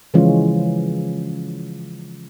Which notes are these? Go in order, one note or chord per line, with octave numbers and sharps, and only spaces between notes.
C#3 E3 F3 G#3 C#4 F4